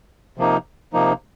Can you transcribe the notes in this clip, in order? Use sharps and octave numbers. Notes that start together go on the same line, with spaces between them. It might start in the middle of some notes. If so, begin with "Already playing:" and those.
C3 F3 A#3 D#4
C3 F3 A#3 D#4